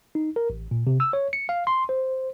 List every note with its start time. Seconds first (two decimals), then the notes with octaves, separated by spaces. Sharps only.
0.15 D#4
0.36 A#4
0.50 A1
0.71 A#2
0.87 C3
1.00 E6
1.13 C#5
1.33 C#7
1.49 F5
1.67 C6
1.89 C5